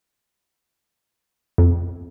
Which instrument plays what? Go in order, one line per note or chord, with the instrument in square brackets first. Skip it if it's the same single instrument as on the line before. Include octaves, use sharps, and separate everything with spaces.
[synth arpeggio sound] F2